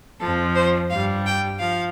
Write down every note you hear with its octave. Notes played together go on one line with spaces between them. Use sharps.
F2 F3 A4
C5
G2 G3 F5
G5
F3 F5